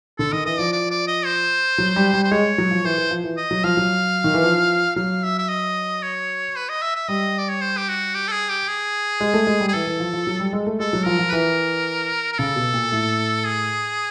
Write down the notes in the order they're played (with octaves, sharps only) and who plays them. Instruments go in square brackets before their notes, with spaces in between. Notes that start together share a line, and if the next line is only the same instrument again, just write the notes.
[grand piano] D3 [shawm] A4
[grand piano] D#3 [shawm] D#5
[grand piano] E3 [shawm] D#5
[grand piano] F3 [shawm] D5
[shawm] D5
D5
D#5
C5
[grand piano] F#3
G3
G3
[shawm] C5
[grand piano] G#3 [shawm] C#5
[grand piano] F#3
F3
[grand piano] E3 [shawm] C5
[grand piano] E3
F3
E3
[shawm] D#5
[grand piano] F#3
[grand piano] F3 [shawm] F5
[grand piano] F#3
D#3
E3
F3
[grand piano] F#3 [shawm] F5
[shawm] E5
E5
D#5
C#5
B4
D#5
E5
E5
[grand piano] G3 [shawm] D#5
[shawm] D5
C#5
C5
G4
F#4
G4
A4
G#4
G4
G#4
[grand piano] G#3
A3
G#3
G3
[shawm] G#4
[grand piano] E3 [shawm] A4
[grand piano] E3
F3
F3
F#3
G3
G#3
A3
[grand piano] G#3 [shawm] A4
[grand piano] F#3
[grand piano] F3 [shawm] A#4
[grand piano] F3
[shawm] B4
[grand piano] E3 [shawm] A#4
[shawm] A#4
[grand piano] C#3 [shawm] A4
[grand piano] B2
A#2
A2
[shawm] G#4